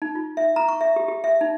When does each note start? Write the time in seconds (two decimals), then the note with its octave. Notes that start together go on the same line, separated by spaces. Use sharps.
0.02 D#4
0.15 F4
0.37 E5
0.56 A#5
0.69 C#6
0.81 E5
0.96 G4
1.08 G4
1.24 E5
1.41 D#4